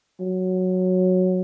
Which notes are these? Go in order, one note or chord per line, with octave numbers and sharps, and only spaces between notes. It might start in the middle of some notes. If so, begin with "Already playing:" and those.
F#3